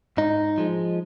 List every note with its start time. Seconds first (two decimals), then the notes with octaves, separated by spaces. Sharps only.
0.17 G#2 D#4
0.58 F3 G#3